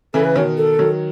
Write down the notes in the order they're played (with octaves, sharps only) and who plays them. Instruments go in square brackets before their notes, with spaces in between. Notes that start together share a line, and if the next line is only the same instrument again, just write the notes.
[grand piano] C#3 E3 [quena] A4
[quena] B4
[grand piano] B2 D#3 [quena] C#5
[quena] A4
[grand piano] D#3 F#3